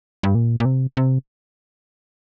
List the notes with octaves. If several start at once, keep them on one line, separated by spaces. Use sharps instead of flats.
G2
A#2
A#2
C3
C3